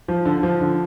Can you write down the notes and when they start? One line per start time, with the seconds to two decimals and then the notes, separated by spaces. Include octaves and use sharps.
0.08 F3
0.25 D3
0.43 F3
0.61 D3